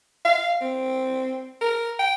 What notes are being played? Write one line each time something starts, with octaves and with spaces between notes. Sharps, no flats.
F5
C4
A#4
G5